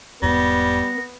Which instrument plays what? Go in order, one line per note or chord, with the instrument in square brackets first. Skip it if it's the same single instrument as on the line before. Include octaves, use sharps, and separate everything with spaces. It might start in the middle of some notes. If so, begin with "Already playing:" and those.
[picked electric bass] E1 E2 G#2 [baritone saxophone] G3 [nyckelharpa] B3 [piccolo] A#6